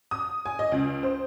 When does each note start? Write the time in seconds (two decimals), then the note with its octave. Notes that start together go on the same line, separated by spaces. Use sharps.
0.11 D#6
0.46 G#5
0.59 D#5
0.72 C#2
1.03 C5